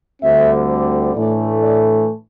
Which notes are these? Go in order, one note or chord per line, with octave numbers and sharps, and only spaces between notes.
D2 D3 G3 C4 E5
A2 E3 A3 D4 D5
D5